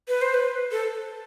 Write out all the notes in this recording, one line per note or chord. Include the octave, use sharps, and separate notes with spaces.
B4
C5
B4
A4